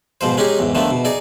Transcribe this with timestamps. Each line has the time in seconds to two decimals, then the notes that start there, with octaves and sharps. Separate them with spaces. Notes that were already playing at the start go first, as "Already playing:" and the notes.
0.21 G#2 B2 F3 C5
0.37 G#3 C#4 D#4 G4 G#4
0.59 E2 G#2
0.75 D3 D#3 F3 A3 B3
0.91 B2
1.05 D#4 G#4 D5